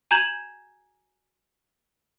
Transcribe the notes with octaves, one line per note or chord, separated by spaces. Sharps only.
G#5 A#5 G6 G#6 E7 F#7